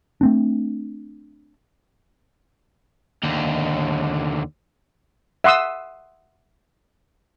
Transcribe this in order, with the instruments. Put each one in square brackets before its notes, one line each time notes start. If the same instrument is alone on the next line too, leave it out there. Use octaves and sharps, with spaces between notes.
[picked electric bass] A3 C4 D4
[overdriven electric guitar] D#2 D3
[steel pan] E5 F#5 C6 D#6 E6